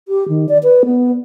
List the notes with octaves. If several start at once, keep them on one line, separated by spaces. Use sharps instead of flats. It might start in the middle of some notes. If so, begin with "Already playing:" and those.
G4
D#3
D5
B4
B3